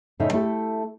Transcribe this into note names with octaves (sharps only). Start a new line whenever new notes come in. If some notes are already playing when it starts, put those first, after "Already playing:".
A2 C#3 A3 D#4 C5 E5
A3 E4 G4 A4